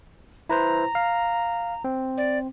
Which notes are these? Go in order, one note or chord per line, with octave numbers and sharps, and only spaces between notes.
E4 B4 C5 A#5
F5
C4
D5